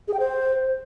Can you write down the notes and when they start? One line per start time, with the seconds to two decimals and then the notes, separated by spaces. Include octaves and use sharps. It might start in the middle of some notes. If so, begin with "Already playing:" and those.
0.08 G#4
0.14 G5
0.19 C5